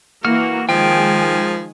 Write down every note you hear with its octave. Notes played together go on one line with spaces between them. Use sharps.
E3 A#3 F#4 F6
D#3 F3 G#3 G5 G#5